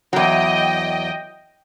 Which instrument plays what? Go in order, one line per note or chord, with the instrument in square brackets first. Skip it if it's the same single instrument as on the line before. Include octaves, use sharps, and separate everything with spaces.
[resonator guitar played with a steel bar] E2 F#3 [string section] D#5 G5